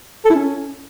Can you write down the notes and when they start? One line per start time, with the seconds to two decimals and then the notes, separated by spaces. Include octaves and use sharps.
0.25 A4
0.30 E4
0.35 C#4